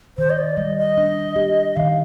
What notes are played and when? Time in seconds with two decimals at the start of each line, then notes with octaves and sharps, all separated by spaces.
0.18 D#3 C5
0.30 D#5
0.38 D5
0.57 G3 D#5
0.78 D#5
0.98 D4
1.36 G4
1.76 D#3 F5